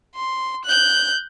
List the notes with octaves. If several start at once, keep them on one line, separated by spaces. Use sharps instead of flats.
C6
F#6 G6